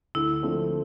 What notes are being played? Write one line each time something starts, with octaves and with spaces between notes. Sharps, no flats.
D2 E4
D3 F3 A3 C4